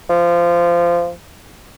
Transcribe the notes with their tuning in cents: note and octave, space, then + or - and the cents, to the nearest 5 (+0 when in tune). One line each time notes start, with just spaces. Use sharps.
F3 -20